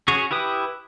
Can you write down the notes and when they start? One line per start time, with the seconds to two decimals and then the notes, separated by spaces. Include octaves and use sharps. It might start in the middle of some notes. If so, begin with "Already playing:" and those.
0.08 C#4 F#4 G#4 C#5
0.31 E4 G4 B4 D#6